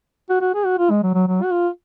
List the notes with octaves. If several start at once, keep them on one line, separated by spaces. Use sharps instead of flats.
F#4
F#4
G#4
F#4
F4
G#3
F#3
F#3
F#3
F#4
F4